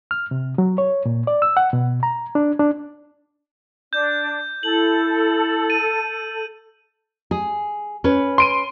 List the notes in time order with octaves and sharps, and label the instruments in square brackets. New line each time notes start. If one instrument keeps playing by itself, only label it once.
[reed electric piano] F6
C3
F#3
C#5
A#2
D5
E6
F#5
B2
A#5
D4
D4
[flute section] D4 [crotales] G6
[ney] E4 [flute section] A4 [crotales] F#7
[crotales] D#7
[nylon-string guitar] G#4
C#4 B4
[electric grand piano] C6 D7 D#7